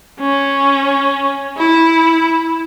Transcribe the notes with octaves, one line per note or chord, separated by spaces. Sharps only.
C#4
E4